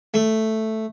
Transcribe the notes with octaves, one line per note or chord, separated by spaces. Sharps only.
A3